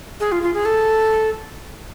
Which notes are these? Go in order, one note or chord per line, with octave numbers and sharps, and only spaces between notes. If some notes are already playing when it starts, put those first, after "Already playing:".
G#4
F4
F4
G#4
A4